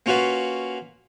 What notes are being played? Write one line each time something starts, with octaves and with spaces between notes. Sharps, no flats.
A#3 C#4 F4 F#4 B4 F5